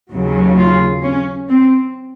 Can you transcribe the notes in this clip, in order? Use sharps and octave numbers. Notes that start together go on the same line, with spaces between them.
D#2 C#3 F#3
F4
C#4
C4